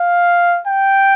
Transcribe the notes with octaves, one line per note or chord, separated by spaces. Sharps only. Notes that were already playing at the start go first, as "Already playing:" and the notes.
Already playing: F5
G5